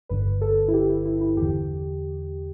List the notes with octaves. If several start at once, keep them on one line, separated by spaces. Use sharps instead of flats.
G1 G2 D3 B4
A4
E4
G4
E4
E4
E4
E2 D3 G4